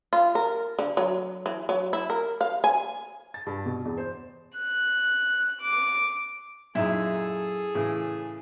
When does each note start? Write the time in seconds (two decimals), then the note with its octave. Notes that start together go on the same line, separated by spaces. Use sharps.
0.13 F4
0.35 A#4
0.79 D3
0.97 F#3
1.46 E3
1.69 F#3
1.93 E4
2.10 A#4
2.41 F5
2.64 G#5
3.34 A6
3.46 G2
3.66 B2
3.85 E2
3.98 C5
4.58 F#6
5.61 D6
6.75 F#2 A#2 D#4 E4 G#4 A4
7.75 A2 C#3 E3